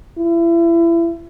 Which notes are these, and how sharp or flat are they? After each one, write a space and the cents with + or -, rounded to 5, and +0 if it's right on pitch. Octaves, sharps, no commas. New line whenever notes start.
E4 +30